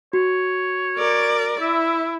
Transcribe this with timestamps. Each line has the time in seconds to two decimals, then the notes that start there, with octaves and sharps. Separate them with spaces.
0.13 F#4 C#5
0.98 A#4 D5
1.61 E4 E5